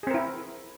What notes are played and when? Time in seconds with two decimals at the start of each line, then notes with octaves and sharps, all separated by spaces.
0.03 G#4
0.07 C4
0.11 A#4
0.14 E4